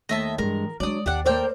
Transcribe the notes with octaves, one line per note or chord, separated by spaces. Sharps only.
D#2 D#3 A3 D#5 E5 A5
G2 E3 G#3 A#4
F#3 G#3 A#3 D4 D5 D#6
D#2 D4 G4 D5 F#5
A#3 A4 A#4 C5 D5 G5